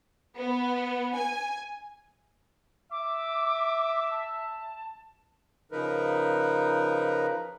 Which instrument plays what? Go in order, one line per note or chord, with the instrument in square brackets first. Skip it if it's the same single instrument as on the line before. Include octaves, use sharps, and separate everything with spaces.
[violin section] B3
G#5
[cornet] E5 [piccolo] D6
[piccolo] A5
[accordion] C#3 F3 D#4 A#4 B4